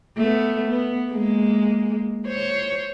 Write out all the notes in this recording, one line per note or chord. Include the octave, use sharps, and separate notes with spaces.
A3 B3
B3
G#3 A#3
C5 C#5